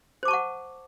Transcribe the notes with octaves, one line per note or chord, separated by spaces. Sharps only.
C5 F#5 A5 C#6 D6